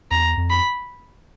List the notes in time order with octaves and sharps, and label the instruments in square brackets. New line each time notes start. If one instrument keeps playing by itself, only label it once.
[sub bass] E2 [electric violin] A#5
[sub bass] F2
[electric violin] B5